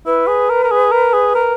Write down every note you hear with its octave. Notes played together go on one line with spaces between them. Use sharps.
E4 B4
G#4
A#4
A#4
G#4
A#4
G#4
A#4